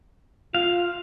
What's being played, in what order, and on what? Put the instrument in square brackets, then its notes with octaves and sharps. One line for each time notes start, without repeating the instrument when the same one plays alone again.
[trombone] F4 [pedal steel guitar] F5